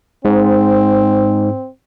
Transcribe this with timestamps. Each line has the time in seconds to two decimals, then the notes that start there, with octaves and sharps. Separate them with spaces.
0.25 G#2 C4